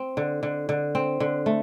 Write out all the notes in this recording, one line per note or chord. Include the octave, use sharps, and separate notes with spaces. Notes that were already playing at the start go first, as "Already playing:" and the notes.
Already playing: C4
D3
D3
D3
C4
D3
A3